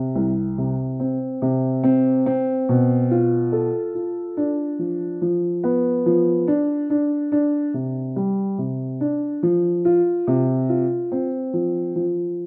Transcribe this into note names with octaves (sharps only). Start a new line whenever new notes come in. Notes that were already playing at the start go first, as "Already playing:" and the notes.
Already playing: C3
C2
C3
C4
C3
C4
C4
B2
F4
A4
F4
D4
F3
F3
B3
F3
D4
D4
D4
C3
G3
C3
D4
F3
F4
C3
F4
C4
F3
F3